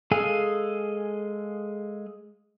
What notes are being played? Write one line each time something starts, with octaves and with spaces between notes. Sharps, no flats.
G#3 G#4 A4 F5 G#5